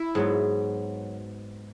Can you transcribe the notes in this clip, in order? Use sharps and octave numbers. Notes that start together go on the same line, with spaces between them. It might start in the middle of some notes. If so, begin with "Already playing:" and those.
Already playing: E4
G#2 F#3 B3